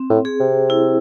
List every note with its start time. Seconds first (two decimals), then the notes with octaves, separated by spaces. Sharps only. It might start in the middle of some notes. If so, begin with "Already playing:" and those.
Already playing: C4
0.10 A2
0.25 G#4
0.40 C3
0.70 E4